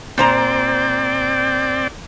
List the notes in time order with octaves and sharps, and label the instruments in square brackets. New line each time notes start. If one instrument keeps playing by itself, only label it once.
[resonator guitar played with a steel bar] A#2 C5 A#5 [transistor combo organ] C4 D5 G5